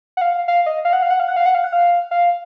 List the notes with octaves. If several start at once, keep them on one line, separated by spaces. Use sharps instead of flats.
F#5
F5
F5
D#5
F5
F#5
F5
F#5
F5
F#5
F5
F#5
F5
F#5
F5
F5